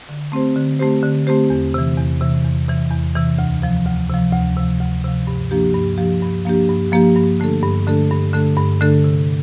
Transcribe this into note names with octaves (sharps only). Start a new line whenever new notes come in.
D3
A3 C4 G4 C5
D3
A3 C4 G4 C5
D3
A3 C4 G4 C5
E2
C3 E3
E2
C3 E3
E2
C3 E3
E2
C3 E3
D2
C3 F3
D2
C3 F3
D2
C3 F3
D2
C3 F3
G2
F3 A#3 D4 G4
G2
F3 A#3 D4 G4
G2
F3 A#3 D4 G4
G2
F3 A#3 D4 G4
G2
D3 A3 D4 A4
G2
D3 A3 D4 A4
G2
D3 A3 D4 A4
G2
D3 A3 D4 A4
C3